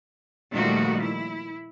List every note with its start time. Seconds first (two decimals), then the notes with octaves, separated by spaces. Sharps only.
0.53 A#2 D#3 F3 G3 A3 F#4
1.02 E4